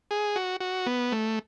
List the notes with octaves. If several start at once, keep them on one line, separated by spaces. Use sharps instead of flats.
G#4
F#4
F#4
B3
A3